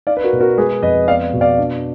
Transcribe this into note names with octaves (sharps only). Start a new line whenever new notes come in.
D#4 D5 F5
B4
F#4 A#4
B2
F#4 A#4
G#3 G#4 B4
F2 B4 D#5
B3 D5 F5
B2
D5 F5
D4